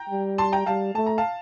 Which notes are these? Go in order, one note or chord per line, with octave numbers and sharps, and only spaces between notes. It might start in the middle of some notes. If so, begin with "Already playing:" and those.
Already playing: G5 A#5
G3
A5 C6
G5 A#5
G3 F5 A5
A3 A5
A#5
F5 A5